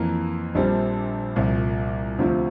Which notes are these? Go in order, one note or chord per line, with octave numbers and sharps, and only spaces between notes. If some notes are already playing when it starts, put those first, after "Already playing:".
Already playing: F2 E3 A#3
A#1 A#2 G3 C4
C2 A#2 F3
D2 C3 F3 C4 F4